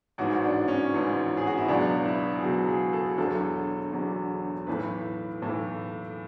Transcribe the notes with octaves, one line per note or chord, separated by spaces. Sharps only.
A1 G#2 E3 F#4
D4
C#4
A1 G#2 E3
G#4
F#4
E4
C#2 B2 F#3 D4
E4
G#4
C#2 B2 F#3 F#4
G#4
A4
E1 E2 D3 F#3 A4
E1 E2 D3 F#3
B1 A2 E3 B4
B1 A2 E3